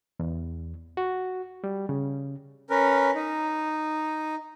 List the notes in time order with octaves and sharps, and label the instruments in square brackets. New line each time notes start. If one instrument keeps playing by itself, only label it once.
[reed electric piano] E2
F#4
G3
C#3
[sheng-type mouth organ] C#4 A#4 B4
D#4